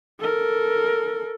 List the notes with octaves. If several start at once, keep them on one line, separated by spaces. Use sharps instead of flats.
A4 A#4